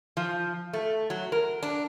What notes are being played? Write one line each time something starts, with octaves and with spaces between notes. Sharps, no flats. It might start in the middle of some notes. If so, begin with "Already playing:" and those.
F3
A3
F#3
A#4
D4